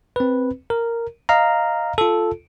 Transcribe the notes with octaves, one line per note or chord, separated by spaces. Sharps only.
C4 B4
A#4
D#5 F5 A#5
F4 A4